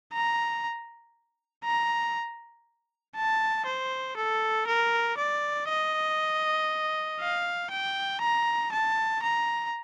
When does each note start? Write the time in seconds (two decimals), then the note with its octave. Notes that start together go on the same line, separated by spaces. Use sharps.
0.13 A#5
1.64 A#5
3.16 A5
3.66 C5
4.17 A4
4.67 A#4
5.17 D5
5.69 D#5
7.20 F5
7.71 G5
8.21 A#5
8.72 A5
9.22 A#5